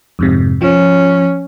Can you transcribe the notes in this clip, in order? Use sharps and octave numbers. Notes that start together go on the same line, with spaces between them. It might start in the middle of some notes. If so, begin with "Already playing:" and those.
F2 G#2 C3
F3 C#4